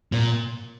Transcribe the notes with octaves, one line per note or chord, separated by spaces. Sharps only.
A#2